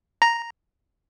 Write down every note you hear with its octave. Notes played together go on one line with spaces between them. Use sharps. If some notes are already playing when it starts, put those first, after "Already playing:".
A#5